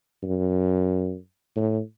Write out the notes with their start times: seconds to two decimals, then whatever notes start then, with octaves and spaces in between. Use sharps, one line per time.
0.23 F#2
1.56 A2